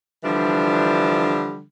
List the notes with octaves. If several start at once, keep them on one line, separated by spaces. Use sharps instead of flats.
D3 E3 F3 G3 D4